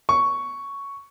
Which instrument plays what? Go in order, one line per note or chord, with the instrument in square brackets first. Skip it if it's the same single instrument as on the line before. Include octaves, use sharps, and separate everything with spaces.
[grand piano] C#6